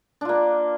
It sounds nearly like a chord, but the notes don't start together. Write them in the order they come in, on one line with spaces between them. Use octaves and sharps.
D4 F4 A#3